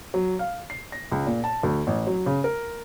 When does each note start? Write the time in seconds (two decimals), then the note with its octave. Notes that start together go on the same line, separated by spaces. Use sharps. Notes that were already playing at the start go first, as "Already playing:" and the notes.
0.14 F#3
0.39 F5
0.70 C7
0.92 A#6
1.12 C#2
1.27 A#2
1.44 A5
1.63 D2
1.87 A1
2.07 F#3
2.26 C#3
2.44 A#4